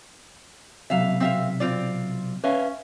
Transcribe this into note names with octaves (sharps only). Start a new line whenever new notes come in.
B1 C3 F#3 E5 F5
C4 E5 F5
C4 F4 D5
C#4 B4 E5 F5